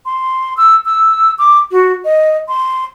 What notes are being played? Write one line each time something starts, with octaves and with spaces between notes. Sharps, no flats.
C6
E6
E6
D6
F#4
D#5
C6